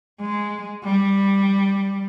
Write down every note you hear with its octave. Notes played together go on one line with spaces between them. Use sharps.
G#3
G3